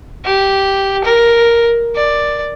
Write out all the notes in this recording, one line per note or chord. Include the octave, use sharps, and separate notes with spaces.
G4
A#4
D5